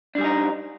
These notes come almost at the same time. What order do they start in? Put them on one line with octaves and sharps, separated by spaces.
D4 G3 G#4 D#4